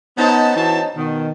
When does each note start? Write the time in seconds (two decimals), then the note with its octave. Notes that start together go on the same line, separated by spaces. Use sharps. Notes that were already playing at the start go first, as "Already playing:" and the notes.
0.17 B3 C#4 D#4 C5 A5
0.56 E3 F#4 A5
0.96 B2 D#3